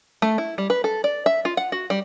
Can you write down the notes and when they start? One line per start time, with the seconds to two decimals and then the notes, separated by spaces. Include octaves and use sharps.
0.22 A3
0.38 E4
0.58 G3
0.70 B4
0.84 A4
1.04 D5
1.26 E5
1.45 F4
1.57 F#5
1.72 F#4
1.90 G3